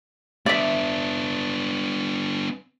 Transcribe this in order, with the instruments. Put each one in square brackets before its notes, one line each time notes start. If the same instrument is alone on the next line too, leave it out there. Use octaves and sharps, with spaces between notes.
[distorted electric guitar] B3 D4 [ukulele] D5 E5